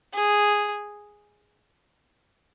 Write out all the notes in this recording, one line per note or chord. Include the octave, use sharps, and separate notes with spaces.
G#4